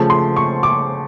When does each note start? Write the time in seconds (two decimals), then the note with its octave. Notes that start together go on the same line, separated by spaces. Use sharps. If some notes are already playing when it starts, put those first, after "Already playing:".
Already playing: C#3 F3 A3
0.10 C6
0.37 C#6
0.63 D6